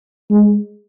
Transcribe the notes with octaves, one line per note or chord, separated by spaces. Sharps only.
G#3